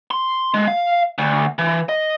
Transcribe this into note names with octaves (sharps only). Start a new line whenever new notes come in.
C6
G#3
F5
D2
E3
D#5